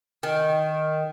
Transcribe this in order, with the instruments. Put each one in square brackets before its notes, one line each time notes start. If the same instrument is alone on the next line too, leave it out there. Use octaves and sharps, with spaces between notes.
[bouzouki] D#3